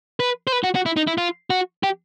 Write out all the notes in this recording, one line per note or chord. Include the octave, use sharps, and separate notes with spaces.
B4
C5
B4
F#4
F#4
E4
D#4
E4
F4
F#4
G4